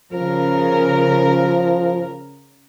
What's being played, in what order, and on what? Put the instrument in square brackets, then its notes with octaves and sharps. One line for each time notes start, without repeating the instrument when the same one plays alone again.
[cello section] C#3 A#4 [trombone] F3